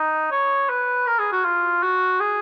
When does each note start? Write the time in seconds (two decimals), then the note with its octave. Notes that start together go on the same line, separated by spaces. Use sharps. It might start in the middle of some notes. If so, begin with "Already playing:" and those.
Already playing: D#4
0.32 C#5
0.69 B4
1.07 A#4
1.19 G#4
1.32 F#4
1.45 F4
1.83 F#4
2.20 G#4